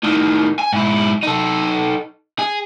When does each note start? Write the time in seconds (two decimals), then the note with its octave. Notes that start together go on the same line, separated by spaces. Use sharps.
0.04 A2 D#3
0.59 G#5
0.73 G#2 E4
1.23 D#4 A4
2.39 G#4